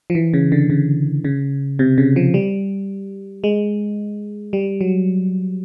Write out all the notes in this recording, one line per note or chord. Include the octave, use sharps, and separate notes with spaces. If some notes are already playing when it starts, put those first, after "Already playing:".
F3
E3
C#3
D3
C#3
C#3
C3
C#3
F3
G3
G#3
G3
F#3